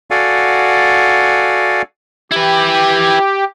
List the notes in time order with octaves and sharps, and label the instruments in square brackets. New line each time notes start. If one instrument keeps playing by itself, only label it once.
[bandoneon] F#4 A4 D5 F5 F#5 G#5
[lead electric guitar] E4 B4 [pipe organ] G4